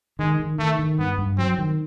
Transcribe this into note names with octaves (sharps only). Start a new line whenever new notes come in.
D#3 G#3
D#3
D#3 A3
D#3
G2 B3
G2
F#3 C4
D#3